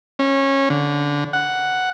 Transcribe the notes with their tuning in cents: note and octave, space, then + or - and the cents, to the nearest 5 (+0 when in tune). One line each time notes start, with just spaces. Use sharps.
C#4 -20
D3 -20
F#5 +5